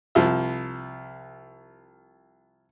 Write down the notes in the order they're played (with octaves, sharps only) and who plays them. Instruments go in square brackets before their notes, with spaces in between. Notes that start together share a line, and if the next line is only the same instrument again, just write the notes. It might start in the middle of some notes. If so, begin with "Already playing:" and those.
[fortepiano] C2 F3